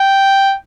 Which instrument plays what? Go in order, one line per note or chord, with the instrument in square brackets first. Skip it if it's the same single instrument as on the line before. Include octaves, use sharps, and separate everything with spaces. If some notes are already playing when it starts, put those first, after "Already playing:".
Already playing: [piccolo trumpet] G5